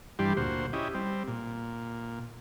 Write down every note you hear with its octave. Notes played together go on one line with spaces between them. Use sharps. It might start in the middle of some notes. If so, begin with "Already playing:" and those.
G2 E3 G3 D4 G4 C6
D2 A#2 F#4 C5
C#4 E4 G4 D#5
G3 C4
A#2